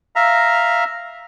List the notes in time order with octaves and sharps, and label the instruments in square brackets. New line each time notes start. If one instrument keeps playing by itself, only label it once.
[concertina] E5 F5 A#5